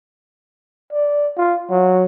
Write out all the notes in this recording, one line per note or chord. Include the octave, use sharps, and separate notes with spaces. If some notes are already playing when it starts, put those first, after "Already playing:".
D5
F4
F#3